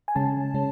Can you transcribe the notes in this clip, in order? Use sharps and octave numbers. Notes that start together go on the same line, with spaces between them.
G#5
C#3 G#3 C#4 A5
C#3 G#3 C#4